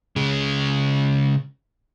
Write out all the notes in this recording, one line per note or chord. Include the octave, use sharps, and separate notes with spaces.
C#3 G#3